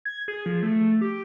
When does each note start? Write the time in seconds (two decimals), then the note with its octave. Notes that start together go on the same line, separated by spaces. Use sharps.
0.05 G#6
0.28 G#4
0.46 F3
0.63 A3
1.01 G4